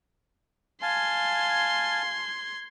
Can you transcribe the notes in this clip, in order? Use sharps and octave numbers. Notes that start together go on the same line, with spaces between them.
F5 G#5 A5 C6 G#6